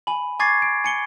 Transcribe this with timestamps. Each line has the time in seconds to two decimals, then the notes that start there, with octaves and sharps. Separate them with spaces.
0.07 G#5 B5
0.40 G#5 C#6 D6 G#6 A6 C7
0.62 D7
0.84 G#5 C#7 G7